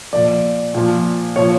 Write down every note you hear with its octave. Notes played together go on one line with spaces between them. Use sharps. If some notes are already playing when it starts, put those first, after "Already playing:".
A#2 F3 D5
A#2 F3
A#2 F3 C#5